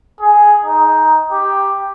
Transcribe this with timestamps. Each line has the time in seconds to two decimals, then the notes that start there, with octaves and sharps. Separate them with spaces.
0.20 G#4
0.65 D#4
1.31 G4